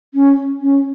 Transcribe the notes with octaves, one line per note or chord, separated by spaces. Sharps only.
C#4
C#4